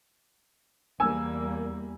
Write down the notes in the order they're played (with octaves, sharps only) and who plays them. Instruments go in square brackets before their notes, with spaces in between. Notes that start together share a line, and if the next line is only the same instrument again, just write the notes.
[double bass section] E2 G3 A#3 [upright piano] G#5 E6